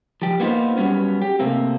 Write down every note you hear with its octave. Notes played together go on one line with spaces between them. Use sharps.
F3 G4
A#3 B3 D#4 F4 C5
F#3 G3 B3 C#4
G4
C3 A3 A#3 C4